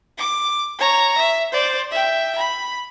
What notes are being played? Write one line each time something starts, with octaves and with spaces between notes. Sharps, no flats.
D6
C#5 A#5
E5
C5 D5
E5 G5
B5